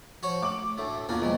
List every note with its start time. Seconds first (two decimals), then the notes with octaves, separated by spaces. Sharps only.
0.23 F3 F#4 C#5
0.42 A3 D6 F#7
0.78 D2 A2 A4
1.09 E2 B2 A#3 D4 F4
1.22 C#2 F3 G3 A#3 D#5